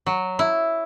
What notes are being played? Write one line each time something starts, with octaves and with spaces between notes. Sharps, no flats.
F#3
E4